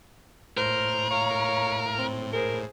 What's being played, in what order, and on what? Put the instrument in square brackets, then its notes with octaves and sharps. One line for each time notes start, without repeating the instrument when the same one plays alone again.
[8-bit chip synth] A2 [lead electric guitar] A#4 [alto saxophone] C5
[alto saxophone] C#5 [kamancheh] F5 A#5
[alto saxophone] C4
[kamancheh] G#4 C5 [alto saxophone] A#4